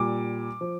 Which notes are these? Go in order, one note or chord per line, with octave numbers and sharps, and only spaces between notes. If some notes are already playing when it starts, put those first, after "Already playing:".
Already playing: A#2 G3 D6
F3